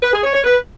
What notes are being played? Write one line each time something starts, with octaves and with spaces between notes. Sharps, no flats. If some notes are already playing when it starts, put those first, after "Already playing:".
B4
G#4
C#5
C#5
B4